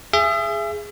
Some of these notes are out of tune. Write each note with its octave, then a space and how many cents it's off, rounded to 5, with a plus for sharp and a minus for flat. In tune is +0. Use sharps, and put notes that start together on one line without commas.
G#4 +0 E5 +35